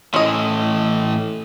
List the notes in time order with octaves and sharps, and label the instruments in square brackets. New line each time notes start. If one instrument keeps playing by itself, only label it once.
[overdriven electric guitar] A2 E3 [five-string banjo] C#4 D#5